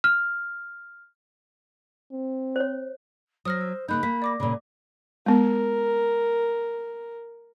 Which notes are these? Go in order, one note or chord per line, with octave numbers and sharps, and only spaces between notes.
F6
C4
C5 C#5
F#3 C5 D#6 F6 A#6
E6
C#3 A#3 D#4 B5 F#6 G6
A#3 B6
D5 D6 A#6
A#2 C#3 B5
G#3 B3 A#4